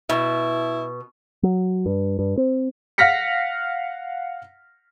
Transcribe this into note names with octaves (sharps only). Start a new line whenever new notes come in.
B2 E4
F#3
G2
G2
C4
F5 F#5 F6 A#6 B6 C#7